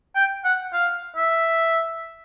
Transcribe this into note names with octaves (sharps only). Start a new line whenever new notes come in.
G5
F#5
F5
E5